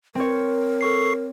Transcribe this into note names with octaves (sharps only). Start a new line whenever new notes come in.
C4 A#4 C#5
A4 C#6 C7